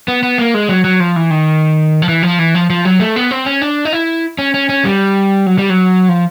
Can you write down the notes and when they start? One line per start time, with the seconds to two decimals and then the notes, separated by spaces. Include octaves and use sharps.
0.08 B3
0.23 B3
0.38 A#3
0.54 G#3
0.69 F#3
0.84 F#3
1.00 F3
1.16 E3
1.30 D#3
2.02 F3
2.08 E3
2.23 F3
2.39 E3
2.55 F3
2.70 F3
2.85 F#3
3.00 A3
3.16 B3
3.31 C4
3.46 C#4
3.61 D4
3.85 D#4
3.93 E4
4.38 C#4
4.54 C#4
4.69 C#4
4.85 G3
5.46 F#3
5.58 G3
5.70 F#3
6.09 F3